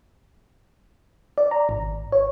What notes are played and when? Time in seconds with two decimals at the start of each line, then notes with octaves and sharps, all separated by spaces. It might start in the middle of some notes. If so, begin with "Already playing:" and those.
1.38 D5
1.51 A#5
1.69 G#1
2.12 C#5